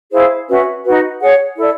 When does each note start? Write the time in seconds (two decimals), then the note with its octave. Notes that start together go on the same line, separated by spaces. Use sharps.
0.12 E4 G#4 C5 F5
0.48 C#4 F#4 B4 E5
0.85 D#4 F#4 B4
1.20 G#4 C#5 F#5
1.56 E4 A4 D5